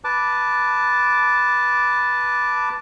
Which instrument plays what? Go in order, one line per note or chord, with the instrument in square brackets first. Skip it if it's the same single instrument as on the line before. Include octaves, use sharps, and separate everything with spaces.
[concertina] B4 A5 D6